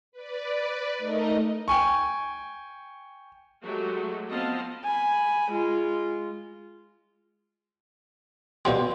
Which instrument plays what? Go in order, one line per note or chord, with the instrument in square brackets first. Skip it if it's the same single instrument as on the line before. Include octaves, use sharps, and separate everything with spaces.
[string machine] B4 D5
A3 D#4 A#4 D#5
[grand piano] G5 G#5 C#6
[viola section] F#3 G#3 A3 F#4 G4
F3 B3 C4 D#5 F5 A5
[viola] G#5 B5
G#3 F4
[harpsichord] B2 F3 G3 [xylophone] D5 C6